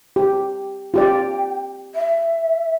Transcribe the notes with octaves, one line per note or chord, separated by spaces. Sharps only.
G4
F4 G4 D5 G5
E5